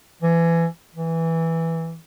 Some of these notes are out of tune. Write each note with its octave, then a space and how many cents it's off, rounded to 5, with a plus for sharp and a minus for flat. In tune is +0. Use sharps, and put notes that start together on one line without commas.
E3 +25
E3 -5